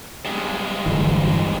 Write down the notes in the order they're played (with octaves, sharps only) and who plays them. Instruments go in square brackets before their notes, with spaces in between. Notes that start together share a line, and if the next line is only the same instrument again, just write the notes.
[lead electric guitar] G2 G#3
[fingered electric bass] D1 G1 E3